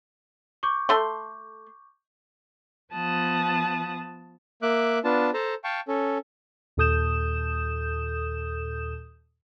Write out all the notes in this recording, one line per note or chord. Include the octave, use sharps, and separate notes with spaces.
C#6 D6 G6
A3 C6
F3 B3 A5 D#6 F#6
A#3 E5 D6 F#6
B3 D4 F4 A5
A4 C5 A5 A#5
F5 G5 A5 C#6
C#4 A4
D#2 A#2 A4 D#6 G6 E7